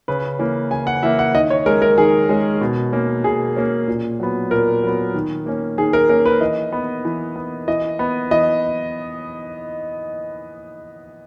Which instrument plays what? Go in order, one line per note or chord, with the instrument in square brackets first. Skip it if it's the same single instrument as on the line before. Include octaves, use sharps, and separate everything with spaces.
[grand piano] C#3 B4
E3 A#3 C#4
C#3 G#5
F#5
E3 A#3 C#4 E5
F#5
D#3 D#5
C#5
G#3 C#4 A#4
A#4
D#3 G#4
G#3 C#4
B2
A#3 C#4
B2 G#4
A#3 C#4
A#2
F#3 B3
A#2 A#4
F#3 B3
D#3
A#3 C#4
D#3 G#4
A#4
A#3 C#4 A#4
B4
E3 D#5
B3
E3
B3
E3 D#5
B3
E3 D#5